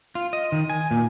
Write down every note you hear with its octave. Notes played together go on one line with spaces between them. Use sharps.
F4
D#5
D#3
G#5
A#2